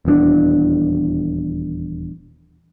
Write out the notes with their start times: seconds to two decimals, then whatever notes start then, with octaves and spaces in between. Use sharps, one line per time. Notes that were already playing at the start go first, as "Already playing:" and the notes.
0.05 D#1 E2 E3 D4